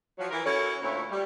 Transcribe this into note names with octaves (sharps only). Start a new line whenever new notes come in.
F3 F#3
E3 A#4
C#4 E4 F#4 A4 C#5
D2 A#2 A3 E4 F4 C#5
G3